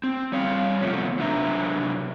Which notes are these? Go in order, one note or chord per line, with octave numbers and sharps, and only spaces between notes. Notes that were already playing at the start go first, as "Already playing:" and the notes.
C4
G3 C#5 F5
C3 F3 A3 B3 C#4
C3 F#3 D4 B4 E5 A#5